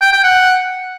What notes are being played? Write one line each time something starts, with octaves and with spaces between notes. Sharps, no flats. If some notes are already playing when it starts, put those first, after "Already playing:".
G5
G5
F#5